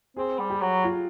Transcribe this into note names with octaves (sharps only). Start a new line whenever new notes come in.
C4 G#4
G3
G4
F#3
F4